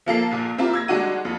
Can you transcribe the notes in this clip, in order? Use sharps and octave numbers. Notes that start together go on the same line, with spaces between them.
F3 A#3 A4 C7
A#1 A#2
C4 E4 F4 G4 A#4
E6 G#6 A#6
G3 G#3 D4 D#4 F#4 D#7
F2